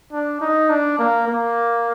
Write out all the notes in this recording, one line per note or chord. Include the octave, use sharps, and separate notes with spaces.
D4
D#4
D4
A#3
A#3